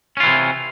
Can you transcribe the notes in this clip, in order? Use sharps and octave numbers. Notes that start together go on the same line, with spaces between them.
C3 E3 C#4 F4